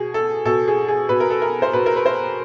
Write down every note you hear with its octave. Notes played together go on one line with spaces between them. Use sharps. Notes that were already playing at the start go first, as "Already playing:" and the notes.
Already playing: B2 G#4
A4
B2 A4
G#4
G#4
B2 B4
A#4
A4
A#4
C5
B2 B4
A#4
B4
C5